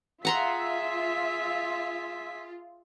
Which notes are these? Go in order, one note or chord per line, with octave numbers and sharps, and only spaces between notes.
F4 G#4 E5 F#5 A#5 C6 B6